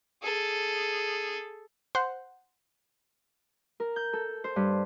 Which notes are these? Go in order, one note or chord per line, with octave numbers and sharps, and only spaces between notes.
G#4 A4
C5 F#5
A#4
G6
A4
C5
G2